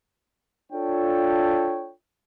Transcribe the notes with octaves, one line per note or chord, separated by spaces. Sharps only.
D4 F4 A4 C#5 G5